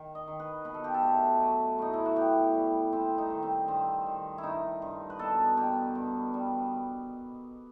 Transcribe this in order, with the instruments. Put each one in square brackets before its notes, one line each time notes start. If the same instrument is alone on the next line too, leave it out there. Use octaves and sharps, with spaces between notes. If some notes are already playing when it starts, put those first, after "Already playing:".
Already playing: [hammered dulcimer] D#3
D#5
D#3
B4
B2 B4
A4
G4
A4
A3
F#3
A2 D#4
E4
F#4
B3 G4
G3
C3 C4
D#4
D#3
C4
G2 C4
D#3
E4
G2 D#4
G2
B4
B2 A4
B2 G4
G2
G3